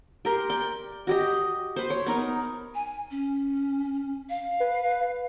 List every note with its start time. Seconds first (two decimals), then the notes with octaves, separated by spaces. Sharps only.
0.25 G4 A#4 C6
0.49 D5 G5
1.07 F#4 G4 D#5
1.76 B4 C5
1.90 C#5
2.06 B3 D#4 A#4
2.74 G#5
3.10 C#4
4.29 F5
4.60 B4